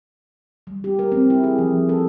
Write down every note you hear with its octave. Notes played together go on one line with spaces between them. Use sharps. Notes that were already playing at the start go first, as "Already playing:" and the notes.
G3
G4
A#4
C4
E4
G#4
F3
A4